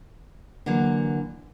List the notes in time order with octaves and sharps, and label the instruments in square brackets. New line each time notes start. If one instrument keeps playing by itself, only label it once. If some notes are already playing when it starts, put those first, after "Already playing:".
[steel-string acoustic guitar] D3 E3 F#3 A#3